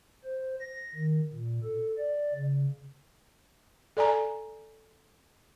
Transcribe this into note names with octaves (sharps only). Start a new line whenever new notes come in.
C5
A#6
D#3
A#2
A4
D5
C#3
A4 D5 G#5 A#5